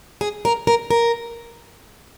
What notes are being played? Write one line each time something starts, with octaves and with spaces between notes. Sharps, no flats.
G#4
A#4
A#4
A#4